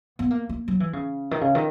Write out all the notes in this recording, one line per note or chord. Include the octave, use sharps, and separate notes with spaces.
B3
A#3
A#3
F#3
E3
C#3
D#3
C#3
D#3